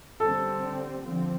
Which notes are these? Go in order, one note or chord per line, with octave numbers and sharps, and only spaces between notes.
D3 G3 C4 A4
D3 F3 C4